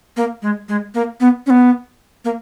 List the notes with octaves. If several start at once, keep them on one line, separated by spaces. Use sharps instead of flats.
A#3
G#3
G#3
A#3
B3
C#4
B3
A#3